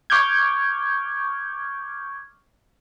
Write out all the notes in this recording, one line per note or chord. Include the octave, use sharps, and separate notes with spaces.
C#6 D6 F6 G6 G#6